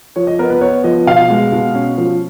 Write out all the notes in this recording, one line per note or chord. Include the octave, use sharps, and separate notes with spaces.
F3 C#5
D#5
B3 A#4
B4
B3 C#5
F3 D#5
B2 F5
G#3
B2
C#4
F3